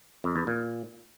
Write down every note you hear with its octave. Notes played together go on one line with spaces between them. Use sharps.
F2
E2
A#2